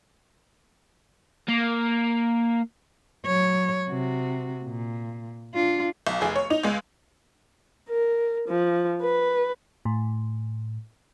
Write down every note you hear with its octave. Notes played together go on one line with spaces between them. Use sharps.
A#3
F#3 C#5
C3 F#4
A#2
D4 F4
B1
F1 G#4
C#5
D#4 F7
C#2 G#3
A#4
F3
B4
A2